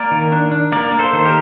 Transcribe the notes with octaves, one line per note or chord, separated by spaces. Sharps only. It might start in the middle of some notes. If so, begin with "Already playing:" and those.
Already playing: A#3 A#4 D5
D#3
D4
D4
A#3 A#4 D5
A#3
A4 C5
D#3 C5
G4 A#4